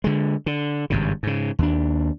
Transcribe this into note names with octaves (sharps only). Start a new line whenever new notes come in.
D3 G#3
D3
G#1 G2 C#3
G#2 C#3
D#2 D4